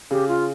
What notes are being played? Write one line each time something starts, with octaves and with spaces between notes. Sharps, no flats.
C#3 G4
F4